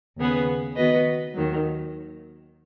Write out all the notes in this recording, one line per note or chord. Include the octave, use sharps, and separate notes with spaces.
D#2 C#3 B3 G#4 B4
D#3 B3 F#4 B4 D#5
D#2 D#3 F#3